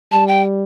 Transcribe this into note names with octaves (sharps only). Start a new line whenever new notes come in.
G3 A5
G5